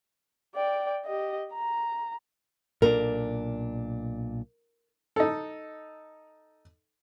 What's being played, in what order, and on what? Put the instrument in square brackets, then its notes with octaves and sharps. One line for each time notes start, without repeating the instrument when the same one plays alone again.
[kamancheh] D5 G5
G4 D#5
A#5
[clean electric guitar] B1 A#2 D4 [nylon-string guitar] A#4
[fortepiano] D#4 A4